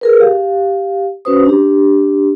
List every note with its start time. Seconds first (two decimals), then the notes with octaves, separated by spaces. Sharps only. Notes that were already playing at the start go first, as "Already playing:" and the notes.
0.01 G#4 A#4 B4
0.20 G4 F5
1.25 C#4 F#4 B4 C5 D#6
1.45 D4 G4